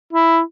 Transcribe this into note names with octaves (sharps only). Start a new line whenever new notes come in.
E4